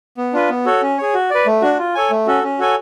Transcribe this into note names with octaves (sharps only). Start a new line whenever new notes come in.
B3
D4 F4 B4
B3
F#4 A4 C#5
C#4
G#4 C#5
F#4
B4 D5
A3
D4 F#4
F4
A4 C#5 G#5
A3
C#4 F#4 A4
C#4
F#4 A4 C#5 G#5